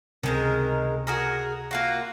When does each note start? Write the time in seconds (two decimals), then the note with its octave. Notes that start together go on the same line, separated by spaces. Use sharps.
0.23 C#2 C3 D#3 G#3 A#4
1.07 F#4 G#4 A#4
1.71 A#3 F4 F#4